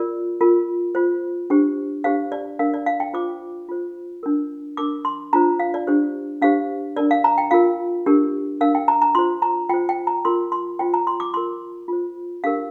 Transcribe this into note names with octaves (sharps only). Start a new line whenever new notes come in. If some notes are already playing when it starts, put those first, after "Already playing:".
Already playing: F4 A#4 D5
F4 A#4
F4 C5
D4 G4 C5
D4 G4 C5 F5
D5
D4 A#4 F5
D5
F5
G5
F4 C5 D6
F4 C5
D4 A#4
D4 A#4 D6
C6
D4 F4 C5 A#5
F5
D5
D4 G4 C5
D4 G4 C5 F5
D4 A#4 D5
F5
A#5
G5
F4 A#4 F5
D4 G4 A#4
D4 A#4 F5
G5
A#5
A#5
F4 C5 C6
A#5
F4 C5 G5
G5
A#5
F4 A#4 C6
C6
F4 C5 G5
A#5
C6
D6
F4 A#4 C6
F4 C5
D4 G4 A#4 F5